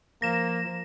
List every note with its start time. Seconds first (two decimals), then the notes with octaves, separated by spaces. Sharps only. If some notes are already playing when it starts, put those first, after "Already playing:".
0.22 F3 A#3 A#6 E7